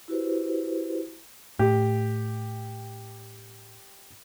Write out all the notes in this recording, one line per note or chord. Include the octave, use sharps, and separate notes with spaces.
E4 F#4 G4 B4 C5
A2 G4